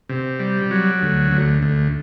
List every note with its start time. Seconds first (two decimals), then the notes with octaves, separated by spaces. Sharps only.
0.09 C3
0.39 G3
0.71 F#3
1.01 D2
1.31 D2
1.62 D2